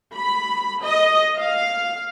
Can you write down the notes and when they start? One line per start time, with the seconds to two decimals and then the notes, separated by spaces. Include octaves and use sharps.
0.14 B5
0.83 D#5
1.37 F5